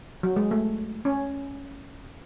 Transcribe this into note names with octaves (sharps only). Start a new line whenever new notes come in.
F#3
G#3
A3
C#4